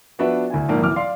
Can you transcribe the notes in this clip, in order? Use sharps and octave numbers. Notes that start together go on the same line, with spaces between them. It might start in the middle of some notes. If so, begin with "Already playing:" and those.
F3 B3 D4 F#4 B4 E5
D2 E4 G#5
A#1 G#2 F3 A#3
D1 E3 D6 F6
D5 F5 C6